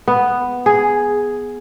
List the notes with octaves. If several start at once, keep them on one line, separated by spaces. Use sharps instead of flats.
B3
G#4